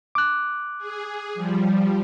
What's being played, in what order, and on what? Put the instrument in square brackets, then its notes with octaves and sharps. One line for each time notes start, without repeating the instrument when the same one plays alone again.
[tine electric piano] D6 F#6
[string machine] G#4
F3 G3